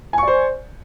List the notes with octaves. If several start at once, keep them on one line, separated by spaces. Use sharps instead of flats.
C5 D5 G#5 C#6